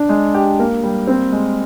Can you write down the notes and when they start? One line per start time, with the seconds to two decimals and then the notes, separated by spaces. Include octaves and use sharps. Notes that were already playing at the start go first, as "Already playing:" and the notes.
Already playing: D4
0.09 G#3
0.34 G4
0.59 A#3
0.83 G3
1.07 C4
1.32 G#3